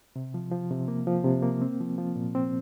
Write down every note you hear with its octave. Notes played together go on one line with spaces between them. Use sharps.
C3
F3
F3
C3
A#3
F3
C3
A#3
C4
F3
F3
A#2
C4